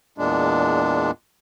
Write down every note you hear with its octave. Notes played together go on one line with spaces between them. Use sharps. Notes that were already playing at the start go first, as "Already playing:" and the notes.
E2 A#2 G#3 D4